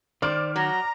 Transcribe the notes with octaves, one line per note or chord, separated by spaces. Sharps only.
D#3 C5 D5 D6 F6
F#3 A#5